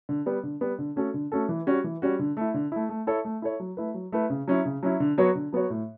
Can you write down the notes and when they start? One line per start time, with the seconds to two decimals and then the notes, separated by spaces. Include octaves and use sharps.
0.09 D3
0.26 G3 B3
0.43 D3
0.61 G3 B3
0.79 D3
0.96 A3 C#4 F#4 A4
1.14 D3
1.32 A3 C#4 F#4 A4
1.49 E3
1.67 G3 C#4 F#4
1.84 E3
2.02 G3 C#4 F#4
2.19 D3
2.37 A3 E4
2.54 D3
2.72 A3 E4
2.89 A3
3.07 E4 A4 C#5
3.25 A3
3.42 E4 A4 C#5
3.60 F#3
3.77 A3 E4 B4
3.94 F#3
4.12 A3 E4 B4
4.30 C#3
4.48 F#3 C#4 E4
4.65 C#3
4.83 F#3 C#4 E4
5.00 D3
5.18 F#3 B3 F#4 C#5
5.35 D3
5.53 F#3 B3 F#4 C#5
5.70 A2